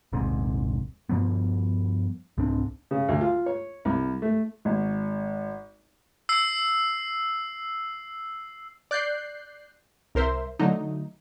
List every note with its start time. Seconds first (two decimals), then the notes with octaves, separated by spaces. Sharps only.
0.13 D#1 A#1 G#2 C3
1.09 G2 F3 G3 B3
2.38 C2 G#2 C4 D4
2.91 C#3
3.09 D2
3.21 F4
3.46 C#5
3.85 C2
4.22 A3
4.65 G#1
6.29 E6 C7
8.91 D5 F#6 G6 C7
10.15 C2 A#4 C5 E5
10.59 D3 F#3 A3 D#4